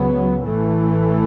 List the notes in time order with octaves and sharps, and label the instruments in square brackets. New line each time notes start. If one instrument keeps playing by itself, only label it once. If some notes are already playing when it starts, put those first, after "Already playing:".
Already playing: [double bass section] C#2 C#3 F#3 B3
A1 A2 E3 A3